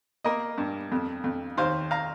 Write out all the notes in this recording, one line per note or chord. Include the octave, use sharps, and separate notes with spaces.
A#3 A#4 D#5
G2
F2
F2
D#2 C5 F5
F5 A#5